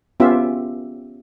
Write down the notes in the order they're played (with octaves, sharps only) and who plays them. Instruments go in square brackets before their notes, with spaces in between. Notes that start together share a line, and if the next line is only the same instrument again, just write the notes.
[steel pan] B3 C#4 F4 G4 E5